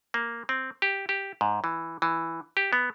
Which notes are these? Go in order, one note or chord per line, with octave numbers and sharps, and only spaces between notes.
A#3
C4
G4
G4
G#2
E3
E3
G4
B3